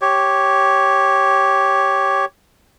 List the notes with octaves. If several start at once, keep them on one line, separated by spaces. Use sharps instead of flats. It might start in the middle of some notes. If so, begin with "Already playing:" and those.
G4 C#5